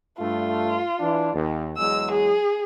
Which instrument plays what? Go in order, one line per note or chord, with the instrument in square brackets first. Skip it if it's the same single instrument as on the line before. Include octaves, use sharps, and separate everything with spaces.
[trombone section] G2 A3 [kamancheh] F4
[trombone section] E3 D4
D#2
[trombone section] E2 F#3 G#3 [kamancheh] E6
[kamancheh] G#4